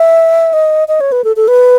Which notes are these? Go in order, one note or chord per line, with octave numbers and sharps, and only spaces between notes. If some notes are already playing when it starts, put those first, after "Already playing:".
Already playing: E5
D#5
D#5
C#5
B4
A4
A4
B4